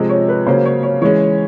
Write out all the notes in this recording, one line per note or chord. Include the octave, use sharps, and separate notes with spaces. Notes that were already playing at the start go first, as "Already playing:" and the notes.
Already playing: C3 F3 G#3 C4 D#5
C#5
B4
C#3 F#3 A#3 C#4 C5
C#5
C#5
E3 G#3 C#4 C#5